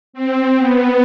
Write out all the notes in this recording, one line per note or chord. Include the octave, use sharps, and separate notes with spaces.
C4
B3